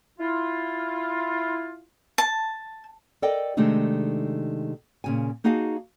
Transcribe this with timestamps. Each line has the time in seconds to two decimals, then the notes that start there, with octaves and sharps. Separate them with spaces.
0.19 E4 F4
2.18 A5
3.22 A4 A#4 D5 D#5 G5
3.57 C3 D#3 G#3 A3 D4 D#4
5.04 A#2 C#3 G#5
5.44 A#3 D#4 F#4 G#4 F5 A5